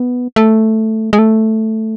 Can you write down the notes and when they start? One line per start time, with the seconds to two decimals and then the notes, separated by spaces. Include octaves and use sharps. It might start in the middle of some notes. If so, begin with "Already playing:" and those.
Already playing: B3
0.36 A3
1.13 G#3
1.19 A3